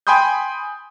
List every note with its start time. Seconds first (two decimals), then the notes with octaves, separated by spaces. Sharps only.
0.07 G5 G#5 B5 C6 D#6 G6